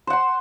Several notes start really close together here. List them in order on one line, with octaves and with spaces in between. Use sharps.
C5 F#5 C6